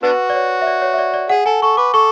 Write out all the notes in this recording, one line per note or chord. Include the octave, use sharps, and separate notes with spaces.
B3 D4 F#4 B4
D5
C#5
E5
D5
C#5
E5
D5
D5
G#4 F#5
A4 G#5
A4 C#6
B4 D6
A4 C#6